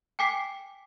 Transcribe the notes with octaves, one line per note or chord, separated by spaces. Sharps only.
G5 G#5 D6 B6 C7